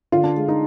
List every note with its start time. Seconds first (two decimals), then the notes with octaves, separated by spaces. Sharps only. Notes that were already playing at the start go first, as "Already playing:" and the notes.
0.12 D3 F4
0.24 D4
0.37 G#3
0.48 D#4